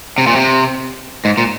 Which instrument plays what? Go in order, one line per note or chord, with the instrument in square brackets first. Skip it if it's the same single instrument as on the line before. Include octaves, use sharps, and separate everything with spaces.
[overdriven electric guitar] C3
A#2
C3
G#2
A#2